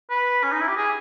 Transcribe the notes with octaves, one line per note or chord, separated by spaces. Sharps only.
B4
C#4
D#4
E4
G4
G#4